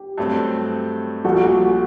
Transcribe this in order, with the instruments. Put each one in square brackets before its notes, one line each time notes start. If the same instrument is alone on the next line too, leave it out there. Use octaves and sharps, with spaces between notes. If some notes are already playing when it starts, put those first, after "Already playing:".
Already playing: [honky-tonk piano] G4
[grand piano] G2 F#3 A3 C4
[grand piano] A#1 A#2 G3 A#3 [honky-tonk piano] F#4 A4